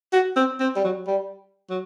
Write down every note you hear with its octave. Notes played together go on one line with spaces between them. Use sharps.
F#4
C4
C4
G3
F#3
G3
F#3